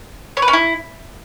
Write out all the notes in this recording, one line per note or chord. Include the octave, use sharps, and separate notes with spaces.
C#5
B4
C#4
E4